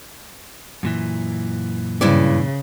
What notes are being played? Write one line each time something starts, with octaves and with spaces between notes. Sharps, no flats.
F#2 A#2 E3
G2 C#3 E4 D5